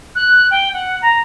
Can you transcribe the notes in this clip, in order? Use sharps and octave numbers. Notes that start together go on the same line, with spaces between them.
F#6
G5
F#5
A#5